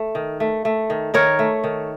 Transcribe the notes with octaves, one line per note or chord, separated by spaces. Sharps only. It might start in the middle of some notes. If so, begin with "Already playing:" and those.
Already playing: A3
D#3
A3
A3
D#3
D#3 A#4 C#5
A3
D#3